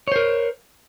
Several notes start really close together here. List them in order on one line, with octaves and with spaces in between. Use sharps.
C#5 C5 A#4